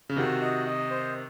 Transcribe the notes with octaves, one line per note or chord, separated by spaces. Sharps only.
C#3
C3 D#3 F#4
D#5
D#5
C5